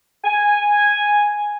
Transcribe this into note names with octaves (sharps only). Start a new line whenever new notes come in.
G#5